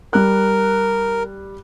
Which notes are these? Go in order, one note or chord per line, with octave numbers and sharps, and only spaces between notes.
G3 A#4 F#6